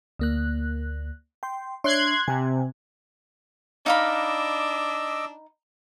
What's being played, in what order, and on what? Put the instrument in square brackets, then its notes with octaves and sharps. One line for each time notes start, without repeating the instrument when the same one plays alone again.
[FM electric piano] D2 A#3 F#6
G5 C6
[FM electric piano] D4 C#5 E5 [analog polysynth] C6 F#6 G#6
[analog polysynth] C3 [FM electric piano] G#5
[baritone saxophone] D4 [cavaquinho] D#4 F5 B5 [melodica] D#5 D6 E6